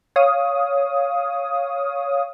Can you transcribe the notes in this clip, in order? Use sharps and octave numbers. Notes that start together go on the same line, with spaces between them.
C#5 F5 D#6